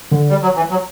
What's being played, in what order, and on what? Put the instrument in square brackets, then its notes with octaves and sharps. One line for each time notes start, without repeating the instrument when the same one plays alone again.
[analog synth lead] D3
[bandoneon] G3
F#3
E3
F#3